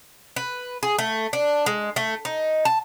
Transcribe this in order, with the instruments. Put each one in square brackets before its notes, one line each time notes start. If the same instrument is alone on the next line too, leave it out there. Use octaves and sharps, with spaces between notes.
[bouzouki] B4
G#4
A3
D4
G#3
A3
D#4
A5